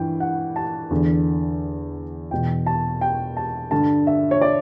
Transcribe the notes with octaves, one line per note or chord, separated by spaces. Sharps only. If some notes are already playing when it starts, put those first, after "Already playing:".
Already playing: G2 E3 G5
F#5
A5
E2 D3
E2 B2 G5
A5
G5
A5
G2 D3 A5
E5
C#5
D5